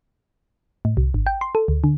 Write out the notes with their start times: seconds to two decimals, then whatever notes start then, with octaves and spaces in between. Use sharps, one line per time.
0.85 A2
0.97 C2
1.14 G#1
1.27 G5
1.41 C6
1.55 A4
1.68 D2
1.84 D3